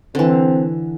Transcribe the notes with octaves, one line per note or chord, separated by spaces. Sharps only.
D3 E3 C4